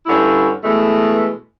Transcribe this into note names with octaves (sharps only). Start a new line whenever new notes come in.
G2 D3 C#4 E4
B2 E3 G#3 A3